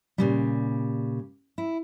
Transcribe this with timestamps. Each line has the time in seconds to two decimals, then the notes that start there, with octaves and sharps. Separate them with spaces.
0.18 A#2 C#3 G3
1.58 E4